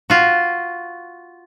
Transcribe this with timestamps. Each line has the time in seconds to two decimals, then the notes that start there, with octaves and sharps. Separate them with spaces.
0.10 F4 F#4